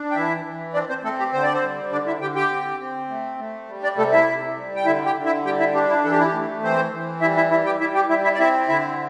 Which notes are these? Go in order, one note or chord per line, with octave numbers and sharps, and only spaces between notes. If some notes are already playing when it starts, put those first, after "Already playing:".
Already playing: D4
G5
E3 E4 E5
E3
C4 D4 D5
C4 C5
A3 C4 A4
G4
D3 C5
D5
C4 C5
G3
D3 D4 D5
E4 E5
D3 G4 G5
G4 G5
C4
C4
A3
A3
G3
D4 D5
C3 A3 A4
E4 E5
C3
G3
G5
D3 E4 E5
G4 G5
D3
E4 E5
G3 G4 G5
E4 E5
D4 G4
E4
E3 A4
G4
E4
G4
A3
E3 C4 C5
E3
G3 E4 E5
E4 E5
G3 E4 E5
G4 G5
G3 E4 E5
G4 G5
G3 E4 E5
E4 E5
D5
C4 E4 E5
D3 E4 E5